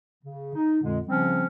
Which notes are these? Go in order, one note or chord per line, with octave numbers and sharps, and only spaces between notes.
C#3
D#4
F2 A#2 D3 G#3
C#3 F3 G3 C4 C#4